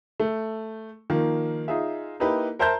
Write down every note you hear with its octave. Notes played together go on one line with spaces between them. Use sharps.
A3
D#3 F3 A#3
D#4 F4 G#4 E5
A#3 D#4 E4 G4 B4
A#4 C5 E5 A5 A#5 G6